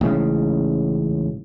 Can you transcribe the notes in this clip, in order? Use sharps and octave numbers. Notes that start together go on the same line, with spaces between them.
A1 G#2 C#3